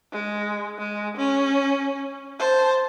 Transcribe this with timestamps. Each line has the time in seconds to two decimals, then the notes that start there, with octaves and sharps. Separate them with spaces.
0.12 G#3
0.78 G#3
1.17 C#4
2.39 C5 A5